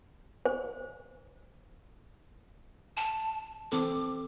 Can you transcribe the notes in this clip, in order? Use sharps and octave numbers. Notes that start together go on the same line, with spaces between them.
C5
A5
E3 C4 A4 D6